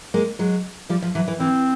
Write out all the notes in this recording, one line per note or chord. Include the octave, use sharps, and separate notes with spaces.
G#3 A#3
F#3 G#3
F3 G3
F3
E3 F#3
E3
E3 C4